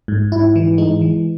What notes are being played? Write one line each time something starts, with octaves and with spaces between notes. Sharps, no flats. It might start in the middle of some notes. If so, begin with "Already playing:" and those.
G#2
G#2 E4
E3
G#3 D#4
E3